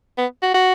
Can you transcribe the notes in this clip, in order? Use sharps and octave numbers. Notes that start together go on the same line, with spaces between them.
B3
F#4
F#4